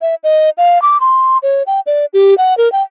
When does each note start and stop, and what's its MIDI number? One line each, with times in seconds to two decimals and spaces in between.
0.02 0.15 76
0.24 0.50 75
0.58 0.81 77
0.82 0.98 86
1.01 1.38 84
1.43 1.63 73
1.67 1.80 79
1.86 2.06 74
2.13 2.37 67
2.38 2.57 78
2.58 2.71 70
2.72 2.82 79